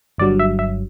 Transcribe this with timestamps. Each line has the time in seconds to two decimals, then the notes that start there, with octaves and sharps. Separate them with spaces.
0.18 G1 G2 F#3 D5
0.39 E5
0.59 E5